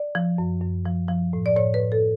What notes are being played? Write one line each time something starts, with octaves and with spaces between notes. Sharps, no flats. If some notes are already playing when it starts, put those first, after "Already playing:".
Already playing: D5
F3
F#2
F#2
F3
F3
A2
D5
A2 C#5
B4
A2
A4